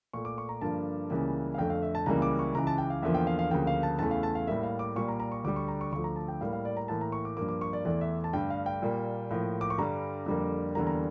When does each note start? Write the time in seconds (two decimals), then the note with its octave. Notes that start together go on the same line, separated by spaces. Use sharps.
0.13 A#2 A3 C#6
0.25 D6
0.38 C#6
0.49 A#5
0.61 G2 D3 F3 A#3 A5
1.10 C#2 C#3 E3 G3 A#3
1.54 F5
1.58 F2 D3 A3 G5
1.70 F5
1.82 E5
1.95 A5
2.06 C#2 C#3 E3 G3 A#3 A#5
2.22 D6
2.39 C#6
2.55 C#2 C#3 E3 A#5
2.67 A5
2.78 G5
2.90 F5
3.02 E2 D3 F3 A#3 E5
3.14 G5
3.27 F5
3.39 F5
3.50 D2 C#3 F3 A#3 G5
3.67 F5
3.83 A5
3.99 E2 C#3 E3 A3 A5
4.11 F5
4.23 A5
4.35 F5
4.47 A2 G3 A#3 E5
4.63 F5
4.79 D6
4.96 A#2 G3 A#3 C#6
5.08 A#5
5.20 A#5
5.32 C#6
5.44 D2 D3 G3 D6
5.56 C#6
5.68 A#5
5.81 C#6
5.92 D2 D3 F3 A3 C#6
6.04 A#5
6.16 A5
6.28 G5
6.41 A2 G3 A#3 F5
6.53 F5
6.65 D5
6.77 A#5
6.88 A2 E3 A#3 A5
7.01 A#5
7.12 C#6
7.25 D6
7.37 G2 F3 A#3 D6
7.49 D6
7.61 C#6
7.73 D5
7.85 E2 E3 A3 D5
8.01 E5
8.24 A5
8.33 G2 D3 A3 G5
8.50 F5
8.66 G5
8.82 A#2 G3 A#3
9.31 A2 F3 A#3
9.61 D6
9.70 C#6
9.78 G2 D3 G3 A#5
10.26 F2 D3 G3 A#3
10.75 E2 D3 G3 A#3 A#5
10.87 A#5